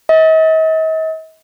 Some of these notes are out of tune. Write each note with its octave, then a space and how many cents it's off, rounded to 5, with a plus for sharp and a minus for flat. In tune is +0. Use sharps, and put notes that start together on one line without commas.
D#5 +45